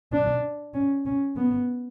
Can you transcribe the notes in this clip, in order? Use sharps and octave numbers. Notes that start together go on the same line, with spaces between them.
D4
C#4
C#4
B3